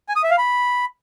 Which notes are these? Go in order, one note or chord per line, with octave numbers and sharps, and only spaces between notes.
G#5
D#6
E5
F5
B5